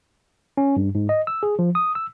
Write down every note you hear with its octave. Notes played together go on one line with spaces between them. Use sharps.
C#4
G2
G#2
D#5
E6
G#4
F3
D#6
E6